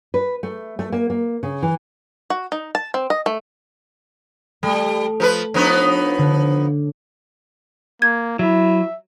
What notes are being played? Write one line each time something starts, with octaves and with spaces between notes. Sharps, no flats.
B4
A3
A3
A#3
A#3
C#3
E3
F#4
D#4
A5
C4
D#5
A3
G3 A3
F3 A4 B4
F3 B3 D4 D#4 C#5
D3
A#3 G#6
F#3 E4 E5